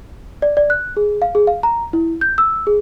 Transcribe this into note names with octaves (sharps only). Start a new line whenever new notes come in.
D5
D5
F#6
G#4
F5
G#4
F5
A#5
E4
G6
E6
G#4